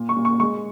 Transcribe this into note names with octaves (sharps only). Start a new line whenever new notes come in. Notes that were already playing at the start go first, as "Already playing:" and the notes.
Already playing: A#2
C#6
A#2
C#6
G#3 C#6